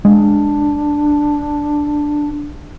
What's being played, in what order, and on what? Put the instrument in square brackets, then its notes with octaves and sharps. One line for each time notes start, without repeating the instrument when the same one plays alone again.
[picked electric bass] G#3 [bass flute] D4